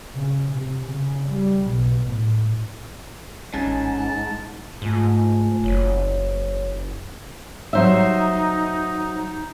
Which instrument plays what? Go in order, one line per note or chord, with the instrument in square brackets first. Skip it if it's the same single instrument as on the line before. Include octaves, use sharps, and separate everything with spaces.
[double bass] C#3
C3
C#3
G3
B1
A2
[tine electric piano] A1 C#4 G#5 [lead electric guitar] G#2 [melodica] A5
[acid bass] G#2 [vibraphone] A3 F4 G#5
[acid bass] F#1 [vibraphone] C#5
[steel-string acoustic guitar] F#3 C5 E5 [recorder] D#4